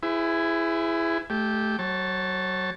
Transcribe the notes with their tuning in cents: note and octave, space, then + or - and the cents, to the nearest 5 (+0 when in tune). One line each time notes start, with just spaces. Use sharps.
E4 +10 G#4 +0 B4 +45
A3 -20 G4 +0
F#3 +25 C#5 -35 A5 +0